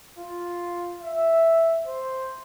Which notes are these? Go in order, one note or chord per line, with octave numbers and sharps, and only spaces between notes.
F4
E5
C5